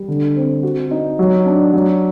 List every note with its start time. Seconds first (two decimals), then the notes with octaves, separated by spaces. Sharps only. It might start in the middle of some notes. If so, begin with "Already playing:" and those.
Already playing: G3
0.08 D3
0.36 C4
0.63 F#4
0.91 D#4
1.19 F#3
1.46 D4
1.73 F#3